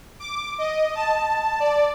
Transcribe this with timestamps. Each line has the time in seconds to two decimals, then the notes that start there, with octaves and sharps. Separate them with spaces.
0.20 D6
0.58 D#5
0.95 A5
1.60 D5